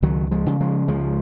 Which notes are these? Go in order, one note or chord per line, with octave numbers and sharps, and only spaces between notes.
C#2 D#3 F#3
F3 G#3
C#3
F3 G#3
C#2 F3 G#3